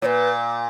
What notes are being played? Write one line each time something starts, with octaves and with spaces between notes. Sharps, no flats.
A#2 B4 C#5